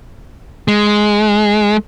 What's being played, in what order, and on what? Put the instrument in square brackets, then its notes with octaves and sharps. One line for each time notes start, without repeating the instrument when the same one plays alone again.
[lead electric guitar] G#3